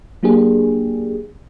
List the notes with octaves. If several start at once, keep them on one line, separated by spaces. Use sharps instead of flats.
F#3 A#3 D4 G4 G#4